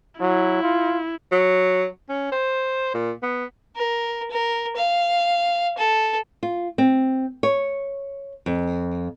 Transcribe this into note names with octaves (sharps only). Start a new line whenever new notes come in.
F#3 E4
F4
F#3
C#4
C5
A#2
B3
A#4
A#4
F5
A4
F4
C4
C#5
F2